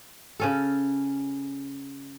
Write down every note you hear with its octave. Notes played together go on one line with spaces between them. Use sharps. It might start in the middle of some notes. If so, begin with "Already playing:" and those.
C#3 C#4 A4